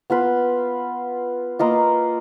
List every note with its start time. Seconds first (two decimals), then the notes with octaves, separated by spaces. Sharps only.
0.10 B3 F4 B4
1.59 A#3 F4 B4 D#5